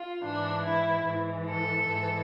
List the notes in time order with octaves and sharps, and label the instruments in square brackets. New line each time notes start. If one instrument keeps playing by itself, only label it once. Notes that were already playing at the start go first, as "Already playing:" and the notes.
Already playing: [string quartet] F4
G#2 E3 D4
E4
G#2 E3
A4
G#2 E3